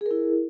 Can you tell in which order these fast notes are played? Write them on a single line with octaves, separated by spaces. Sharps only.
G#4 A#4 E4